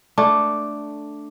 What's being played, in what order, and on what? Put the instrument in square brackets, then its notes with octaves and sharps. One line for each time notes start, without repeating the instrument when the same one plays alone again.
[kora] A3 D4